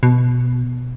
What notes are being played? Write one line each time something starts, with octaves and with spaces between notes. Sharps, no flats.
B2